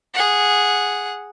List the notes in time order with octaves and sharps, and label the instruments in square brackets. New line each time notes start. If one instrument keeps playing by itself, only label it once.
[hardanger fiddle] G#4 F#5